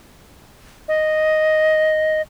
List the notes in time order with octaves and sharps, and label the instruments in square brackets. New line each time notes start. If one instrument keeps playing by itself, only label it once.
[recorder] D#5